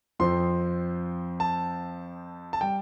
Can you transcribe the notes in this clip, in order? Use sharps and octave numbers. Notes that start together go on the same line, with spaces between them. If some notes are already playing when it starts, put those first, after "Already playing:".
F2 F3 C4 C6
A5
A5
G3 G5